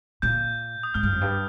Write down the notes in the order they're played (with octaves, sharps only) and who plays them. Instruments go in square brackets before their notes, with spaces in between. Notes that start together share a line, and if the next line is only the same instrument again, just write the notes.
[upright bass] A#2 [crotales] G6
[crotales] D#6
[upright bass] G#2 [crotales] F6
[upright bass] G2
F2
G2